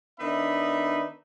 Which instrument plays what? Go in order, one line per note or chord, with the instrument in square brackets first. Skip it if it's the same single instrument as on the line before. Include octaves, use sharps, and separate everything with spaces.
[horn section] D#3 B3 D4 D#4 E5 B5